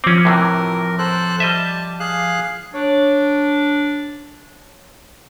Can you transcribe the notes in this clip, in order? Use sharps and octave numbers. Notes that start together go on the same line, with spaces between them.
F3 C4 C#4 D6
A2 C3 E3 A#4
A4 C5 F#6
G3 D#5 E5 A5
G#4 F5 F#6
D4 C#5